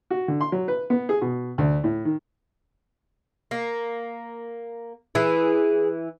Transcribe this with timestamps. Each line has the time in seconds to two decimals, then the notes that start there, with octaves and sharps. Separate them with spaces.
0.11 F#4
0.28 D3
0.41 C6
0.52 F#3
0.68 B4
0.90 B3
1.09 G#4
1.22 B2
1.58 D2
1.84 A2
2.05 D#3
3.51 A#3
5.15 E3 E4 G#4